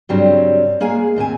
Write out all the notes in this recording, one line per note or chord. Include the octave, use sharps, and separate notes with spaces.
G2 C#3 F#3 G3 C4
G#3 A#3 G#4 F5 G#5
D#2 A#2 C4 G#5